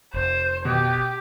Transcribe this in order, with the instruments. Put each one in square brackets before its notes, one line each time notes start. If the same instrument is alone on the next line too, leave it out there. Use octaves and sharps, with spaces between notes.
[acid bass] F1 [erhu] C5
[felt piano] B2 [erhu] G4